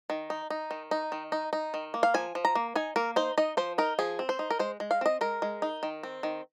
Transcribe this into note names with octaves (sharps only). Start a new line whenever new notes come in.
D#3
D#4
D#4
D#3
D#4
D#3
D#4
D#4
D#3
A#3
F5
F3 G#5
F3
A#5
A#3
D#4 G#5
A#3 A#4
D#4 C5
D#4 D#5
F3 C5
D#4 A#4
F3 G#4
C4
C5
D#4
A#4
G#3 C5
G#3
F5
C4 D#5
G#3 A#4
G#3
D#4
D#3
C4
D#3